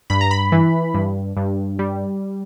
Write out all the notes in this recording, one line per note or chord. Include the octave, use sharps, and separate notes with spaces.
G2 B5
A#5
B5
E3
G2
G2
G3